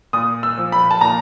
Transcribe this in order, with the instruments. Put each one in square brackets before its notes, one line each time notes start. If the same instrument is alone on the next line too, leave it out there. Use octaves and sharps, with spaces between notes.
[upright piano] A#2 D#6
E6
F3
B5
A5
A#2 A#5